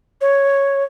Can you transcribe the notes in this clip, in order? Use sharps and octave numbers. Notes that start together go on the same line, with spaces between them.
C#5